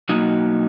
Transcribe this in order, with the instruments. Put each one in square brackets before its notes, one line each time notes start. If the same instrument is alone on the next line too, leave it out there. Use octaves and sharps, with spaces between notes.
[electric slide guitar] B2 F#3 A#3 D#4 F#4